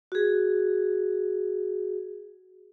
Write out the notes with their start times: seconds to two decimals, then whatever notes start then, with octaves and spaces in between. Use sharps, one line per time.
0.12 F#4 G#4